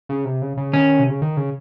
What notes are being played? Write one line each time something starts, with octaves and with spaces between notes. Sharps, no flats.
C#3
C3
C#3
C#3
D#3 C#4
C3
C#3
D#3
C#3